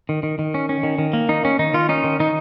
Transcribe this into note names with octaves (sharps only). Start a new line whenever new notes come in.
D#3
D#3
D#3
C#4
C#4
D#3
D#3
A#3
D#3 D#4
D#3 C#4
D#3 D#4
D#3 F4
C#4 D#4
D#3
D#3 D#4